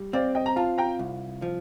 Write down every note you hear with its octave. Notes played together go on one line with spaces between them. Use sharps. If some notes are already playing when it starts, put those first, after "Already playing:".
Already playing: G3
C4 D5 F5
D#5 G5
A#5
F4 F5 A5
G5 A#5
C2
F3